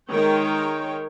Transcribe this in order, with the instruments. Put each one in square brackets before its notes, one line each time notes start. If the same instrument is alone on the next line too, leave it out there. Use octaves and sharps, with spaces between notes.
[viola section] D#3 G#3 A#4 C#5 G5